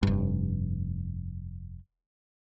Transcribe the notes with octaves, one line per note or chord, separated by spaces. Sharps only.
F1 G2